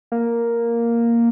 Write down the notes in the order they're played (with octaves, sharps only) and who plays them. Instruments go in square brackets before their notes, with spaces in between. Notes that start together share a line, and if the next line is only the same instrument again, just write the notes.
[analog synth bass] A#3